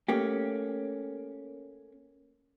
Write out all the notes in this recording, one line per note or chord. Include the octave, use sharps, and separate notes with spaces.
A3 A#3 C#4 G4